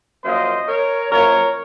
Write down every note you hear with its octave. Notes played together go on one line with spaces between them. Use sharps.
F#2 F3 A#3 C5 D#5
A#4 C#5
F#2 F3 A#3 A#4 C#5